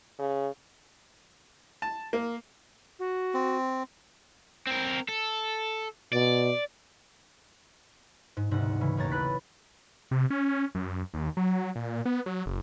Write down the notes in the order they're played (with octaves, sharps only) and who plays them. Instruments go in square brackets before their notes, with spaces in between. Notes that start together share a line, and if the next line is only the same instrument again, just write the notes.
[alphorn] C#3
[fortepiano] A5
A#3
[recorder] F#4
[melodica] C4
[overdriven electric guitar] C4 A#4
A4
[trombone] B2 [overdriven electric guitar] D5
[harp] G#2
E1 D2 G#2 C3 F#5
C#3 E3
A1 D#2 C#5 A#5 A6
E4 B4 B5 F#6 B6
[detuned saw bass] C3
C#4
F#2
D#2
F#3
A#2
B3
F#3
F#1